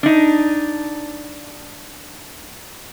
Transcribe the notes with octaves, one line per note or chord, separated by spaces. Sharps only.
D4 D#4